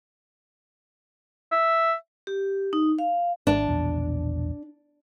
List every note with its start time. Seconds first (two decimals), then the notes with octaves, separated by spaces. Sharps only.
1.52 E5
2.27 G4
2.73 D#4
2.99 F5
3.47 G#1 D4
3.68 E1 A#1 E2